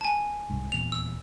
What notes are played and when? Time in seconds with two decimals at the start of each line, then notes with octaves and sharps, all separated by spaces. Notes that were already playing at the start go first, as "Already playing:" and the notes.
0.01 G#5 A5
0.50 C2 G#2
0.72 D#1 E2 A#2 F7
0.92 E6